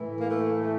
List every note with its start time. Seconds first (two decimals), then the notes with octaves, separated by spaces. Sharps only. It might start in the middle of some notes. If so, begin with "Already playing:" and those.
Already playing: A2 E3
0.19 A#3
0.27 A3
0.60 A3